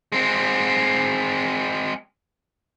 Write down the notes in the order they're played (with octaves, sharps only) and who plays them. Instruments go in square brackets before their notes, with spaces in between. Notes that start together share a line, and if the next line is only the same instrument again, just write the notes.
[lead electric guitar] G#3 C4